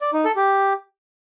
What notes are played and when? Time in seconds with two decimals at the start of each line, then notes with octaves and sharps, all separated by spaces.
0.01 D5
0.13 D#4
0.25 A4
0.36 G4